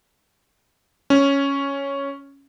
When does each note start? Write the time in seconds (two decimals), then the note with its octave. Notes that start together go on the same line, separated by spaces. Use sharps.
1.10 C#4